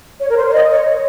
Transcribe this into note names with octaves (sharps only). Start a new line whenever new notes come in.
C#5
A#4
C5
C#5
D#5
C#5